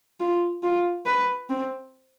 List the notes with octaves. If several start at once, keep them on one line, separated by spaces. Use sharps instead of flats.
F4
F4
B4
C4